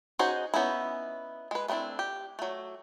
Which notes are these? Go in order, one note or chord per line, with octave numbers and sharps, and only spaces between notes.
C#4 D#4 F#4 G#4 C5
B3 C#4 D#4 E4
G#3 B4
A3 B3 C4 D4 E4
G4
F#3 A3